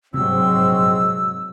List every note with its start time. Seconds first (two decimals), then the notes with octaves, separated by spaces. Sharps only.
0.14 A#1 G#2 C3 F#3 G#3 C4 E6